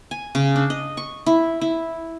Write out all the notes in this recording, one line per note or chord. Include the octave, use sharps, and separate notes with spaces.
G#5
C#3
D4
D#5
C#6
E4
E4